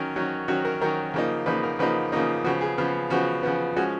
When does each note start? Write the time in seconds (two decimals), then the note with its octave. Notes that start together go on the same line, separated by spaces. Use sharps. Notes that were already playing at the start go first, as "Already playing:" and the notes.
Already playing: D#3 F#3 C#4 A#4
0.16 D#3 F#3 C#4
0.48 D#3 F#3 C#4 F#4
0.65 A#4
0.81 D#3 F#3 C#4 A#4
1.14 C#3 F3 A#3 D#4
1.46 C#3 F3 A#3 D#4 B4
1.63 A#4
1.79 C#3 F3 A#3 D#4 B4
2.12 C#3 F3 A#3 D#4
2.44 C#3 F3 B3 F#4
2.61 G#4
2.78 C#3 F3 B3
3.10 C#3 F3 B3 F#4
3.43 C#3 F3 B3
3.76 F3 G#3 C#4 F#4